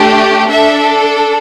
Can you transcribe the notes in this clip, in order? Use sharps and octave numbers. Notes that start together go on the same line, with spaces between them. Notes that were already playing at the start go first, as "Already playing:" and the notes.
Already playing: A3 D4 G4
D4 A4 E5